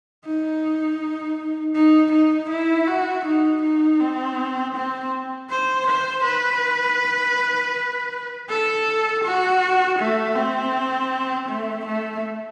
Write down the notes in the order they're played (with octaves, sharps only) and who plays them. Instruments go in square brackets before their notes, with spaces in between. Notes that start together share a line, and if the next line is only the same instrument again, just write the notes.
[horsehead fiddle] D#4
D#4
D#4
E4
F#4
D#4
D#4
C4
C4
C5
C5
B4
A4
F#4
A3
C4
A3
A3